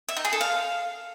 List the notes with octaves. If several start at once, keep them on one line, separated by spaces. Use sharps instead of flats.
E5
D#4
G#4
A4
F5